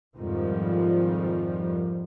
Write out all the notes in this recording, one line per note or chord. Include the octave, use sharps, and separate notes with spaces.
F2 G#2 D#3 F3 G3